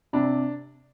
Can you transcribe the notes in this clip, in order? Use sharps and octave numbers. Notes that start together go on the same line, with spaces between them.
C3 D4